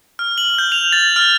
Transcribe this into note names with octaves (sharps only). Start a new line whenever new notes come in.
F6
F#7
G6
F7
A6
F6